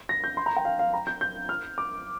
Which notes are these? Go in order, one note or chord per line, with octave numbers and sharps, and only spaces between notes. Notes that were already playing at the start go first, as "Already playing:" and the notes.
A#6
G6
C6
A#5
G5
F5
F5
A#5
G6
G6
F6
D6